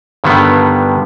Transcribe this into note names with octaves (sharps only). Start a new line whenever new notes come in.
G2 D3 D#3 G3 B3